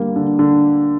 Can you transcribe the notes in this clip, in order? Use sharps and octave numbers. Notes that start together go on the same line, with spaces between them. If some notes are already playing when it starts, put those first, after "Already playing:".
Already playing: D3 G3 A#3
D3
D3